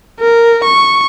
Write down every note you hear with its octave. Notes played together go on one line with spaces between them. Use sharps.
A#4
C#6